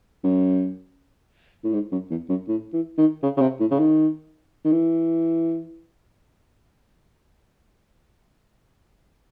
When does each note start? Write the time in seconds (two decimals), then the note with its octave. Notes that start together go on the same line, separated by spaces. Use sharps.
0.24 F#2
1.64 A2
1.73 G#2
1.92 F#2
2.10 E2
2.29 F#2
2.48 A2
2.73 E3
2.98 D#3
3.23 C#3
3.37 C#3
3.41 C3
3.60 A2
3.71 C#3
3.79 D#3
4.65 D#3
4.72 E3